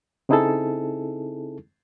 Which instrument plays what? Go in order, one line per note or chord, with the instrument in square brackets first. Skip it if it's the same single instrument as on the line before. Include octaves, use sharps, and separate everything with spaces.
[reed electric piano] C#3 C4 D#4 E4 G#4 A4